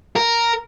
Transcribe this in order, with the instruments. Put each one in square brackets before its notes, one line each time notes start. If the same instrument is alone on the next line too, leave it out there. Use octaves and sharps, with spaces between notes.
[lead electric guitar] A#4